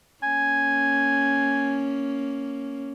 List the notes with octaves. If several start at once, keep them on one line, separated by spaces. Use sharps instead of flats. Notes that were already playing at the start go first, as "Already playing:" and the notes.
A#3 C#4 G#5